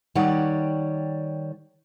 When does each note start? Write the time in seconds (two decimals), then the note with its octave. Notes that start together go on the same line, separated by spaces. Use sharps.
0.15 D#3 G3 C#5 D5 F#5